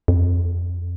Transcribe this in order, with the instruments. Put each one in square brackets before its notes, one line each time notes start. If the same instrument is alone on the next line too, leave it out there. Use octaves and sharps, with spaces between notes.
[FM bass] F2